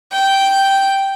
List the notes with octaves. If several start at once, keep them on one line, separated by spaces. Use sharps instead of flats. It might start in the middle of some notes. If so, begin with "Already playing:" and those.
G5